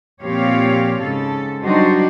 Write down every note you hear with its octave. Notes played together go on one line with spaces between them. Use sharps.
A#2 F3 C4 G4 C#5 F5
G#2 C#3 A4
F#3 G3 D4 D#4 F#4 C5